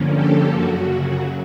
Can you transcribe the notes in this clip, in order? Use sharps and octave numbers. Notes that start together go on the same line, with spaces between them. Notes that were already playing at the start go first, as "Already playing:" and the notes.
Already playing: G2 D3 F3 A#3 C#4
G4 A4
F#2 C#3 F#3 F#4